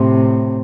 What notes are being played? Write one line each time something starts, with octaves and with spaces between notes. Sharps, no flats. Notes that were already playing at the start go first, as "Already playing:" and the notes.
Already playing: A2 C3